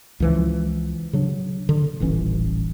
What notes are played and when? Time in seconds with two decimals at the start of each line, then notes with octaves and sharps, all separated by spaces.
0.20 C#2 E3 F3
1.13 C#3 F#3 D4
1.69 D3
2.00 D#1 A1 E3 C#4